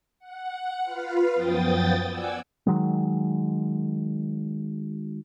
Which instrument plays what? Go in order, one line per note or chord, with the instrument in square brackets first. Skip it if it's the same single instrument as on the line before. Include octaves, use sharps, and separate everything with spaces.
[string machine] F#5
F4 B4 F5
F#2 F3 B3 G5 D#6 A6
D5 F#5 G#5 D6 E6
[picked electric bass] D#3 F#3 G#3